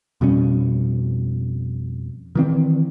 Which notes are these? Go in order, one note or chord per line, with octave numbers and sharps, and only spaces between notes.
F2 B2 G3 C#4
D#3 E3 C4